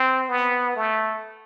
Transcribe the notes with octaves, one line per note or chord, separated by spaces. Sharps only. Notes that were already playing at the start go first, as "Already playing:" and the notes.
Already playing: C4
B3
A3